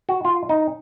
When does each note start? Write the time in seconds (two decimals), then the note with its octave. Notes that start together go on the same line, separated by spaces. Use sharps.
0.09 F#4
0.25 F4
0.49 D#4